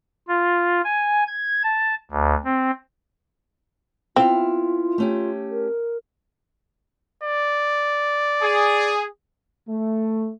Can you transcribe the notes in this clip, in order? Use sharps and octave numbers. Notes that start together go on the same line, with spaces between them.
F4
G#5
G#6
A5
D2
C4
B3 C4 E4 F4 F5
A3 C#4 G4
A#4
D5
G#4
A3